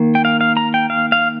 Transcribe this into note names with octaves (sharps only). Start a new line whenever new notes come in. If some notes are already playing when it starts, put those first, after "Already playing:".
Already playing: D#3 A#3
G5
F5
F5
A#5
G5
F5
F5